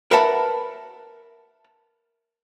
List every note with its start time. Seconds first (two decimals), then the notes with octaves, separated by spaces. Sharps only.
0.11 A#4 B4 E5 F#5 A5 B5